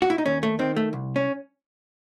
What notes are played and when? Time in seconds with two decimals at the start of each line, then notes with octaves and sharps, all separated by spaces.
0.02 F#4
0.10 E4
0.18 D#4
0.26 D#2 C#4
0.43 A3
0.59 D#3 C4
0.77 A3
0.93 C2
1.16 C#4